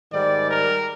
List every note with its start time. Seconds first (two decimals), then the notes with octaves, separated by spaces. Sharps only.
0.12 G#2 D#3 G3 D5
0.50 A#4